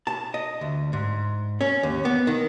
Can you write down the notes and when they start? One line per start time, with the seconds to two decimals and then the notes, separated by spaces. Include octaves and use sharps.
0.07 A5
0.34 D#5
0.61 D2
0.93 G#2
1.61 C#4
1.83 D#2
2.05 B3
2.27 D#3